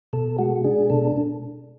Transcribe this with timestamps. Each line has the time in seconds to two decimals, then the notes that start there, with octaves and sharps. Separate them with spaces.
0.13 B2 A4
0.38 G#3 F#4
0.64 D4 G#4
0.90 B2 A4